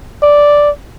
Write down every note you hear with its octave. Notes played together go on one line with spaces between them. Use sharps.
D5